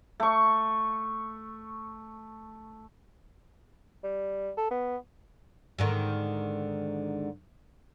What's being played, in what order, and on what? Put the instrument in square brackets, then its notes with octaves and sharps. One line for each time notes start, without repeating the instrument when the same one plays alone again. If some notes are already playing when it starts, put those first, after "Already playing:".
[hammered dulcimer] A3 C#6
[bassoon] G3
A4
B3
[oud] G#2 D3 D#3